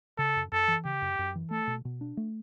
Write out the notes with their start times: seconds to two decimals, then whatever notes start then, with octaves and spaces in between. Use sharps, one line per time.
0.18 C#3 A4
0.36 F#2
0.52 F#2 A4
0.68 E3
0.85 C#3 G4
1.02 F#2
1.19 F#2
1.35 E3
1.51 A3 A4
1.67 B2
1.85 B2
2.01 D4
2.17 A3